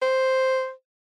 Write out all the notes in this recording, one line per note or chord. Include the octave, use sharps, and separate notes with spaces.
C5